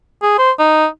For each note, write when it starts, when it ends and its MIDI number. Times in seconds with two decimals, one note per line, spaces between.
0.22 0.35 68
0.38 0.51 72
0.59 0.86 63